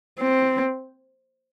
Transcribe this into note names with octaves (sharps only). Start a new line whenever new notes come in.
C4